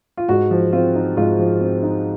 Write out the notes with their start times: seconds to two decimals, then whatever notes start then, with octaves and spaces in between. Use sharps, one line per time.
0.17 F4
0.29 G#2 F#4
0.51 F3
0.73 C4 F4
0.95 D#4
1.17 G#2 F4
1.39 F3
1.61 C4
1.83 D#4